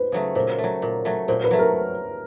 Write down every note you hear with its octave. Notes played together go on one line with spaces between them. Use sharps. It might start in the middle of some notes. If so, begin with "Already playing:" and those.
Already playing: B4 C5
C#3 F#3 A3
A#2 C5
A3
F#3
A#2
F#3 A3
A#2 C5
B4
F#3 A3
A#4